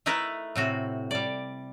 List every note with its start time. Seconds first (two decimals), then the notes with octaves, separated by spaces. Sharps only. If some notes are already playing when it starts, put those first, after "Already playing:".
0.06 A3 D#4 E4 A#4 B4
0.56 A2 C3 F#4
1.11 G3 D5